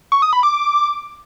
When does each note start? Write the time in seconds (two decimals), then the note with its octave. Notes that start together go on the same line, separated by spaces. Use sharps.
0.12 C#6
0.22 D#6
0.33 B5
0.43 D6